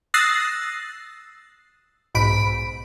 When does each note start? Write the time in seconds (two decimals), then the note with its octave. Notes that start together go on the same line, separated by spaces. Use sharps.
0.14 D#6 E6 F#6 A6 A#6 C7
2.14 B1 G#2 B5 D7